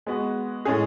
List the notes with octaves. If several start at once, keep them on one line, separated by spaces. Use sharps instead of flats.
G#3 B3 F#4
A2 G#3 C#4 G#4